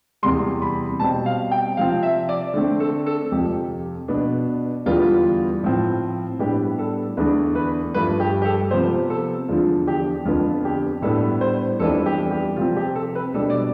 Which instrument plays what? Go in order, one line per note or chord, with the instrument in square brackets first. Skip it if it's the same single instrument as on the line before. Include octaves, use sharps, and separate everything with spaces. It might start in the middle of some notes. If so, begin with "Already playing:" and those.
[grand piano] E2 C3 G3 C6
B5
B2 G3 C4 A5
F5
G5
C3 F3 C4 F5
E5
D5
D3 A3 C4
A4
A4
F2 C3 F3 G4
B2 B3 D4
E2 D3 G3 B3 D4 F4
F4
A2 F3 C4
A2 G3 B3 D4 G4
A4
E2 D3 A3 D4 B4
B4
G2 F3 A3 B4
G4
G4
A4
C3 F3 B3 C5
A4
E2 D3 F3 F4
G4
F2 D3 F3 B3 F4
G4
A2 G3 B3 D4 A4
C5
F2 E3 G3 B3 D4 A4
G4
G4
C3 F3 C4 F4
G4
A4
B4
B2 G3 D4 A4
D5